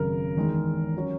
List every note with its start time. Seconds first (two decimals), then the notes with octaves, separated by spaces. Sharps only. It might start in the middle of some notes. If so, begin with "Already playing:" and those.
Already playing: G#1 F#2 C#3 A#4
0.36 E2 D#3 G#3
0.97 F#3 C#4